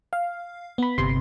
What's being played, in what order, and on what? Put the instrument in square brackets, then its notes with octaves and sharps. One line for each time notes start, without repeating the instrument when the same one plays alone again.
[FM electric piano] F5
B3 B5
G1 C3 C6